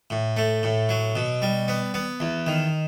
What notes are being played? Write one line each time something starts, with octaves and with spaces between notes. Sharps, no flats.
A2
A3
A2
F#3
B2
G3
B3
B3
E2
D#3